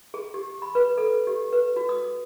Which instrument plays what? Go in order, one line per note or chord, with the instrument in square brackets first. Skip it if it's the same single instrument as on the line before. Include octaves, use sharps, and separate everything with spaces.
[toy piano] G#4
G4
B5
B4
A4
G4
B4
F#4
D#6